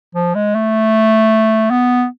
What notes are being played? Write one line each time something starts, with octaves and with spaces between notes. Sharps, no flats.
F3
G#3
A3
B3